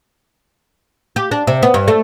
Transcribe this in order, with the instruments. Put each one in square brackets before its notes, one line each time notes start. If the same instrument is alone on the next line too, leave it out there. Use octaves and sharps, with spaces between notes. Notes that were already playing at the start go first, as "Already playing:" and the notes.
[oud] G4
D4
C3
B3
G2
A3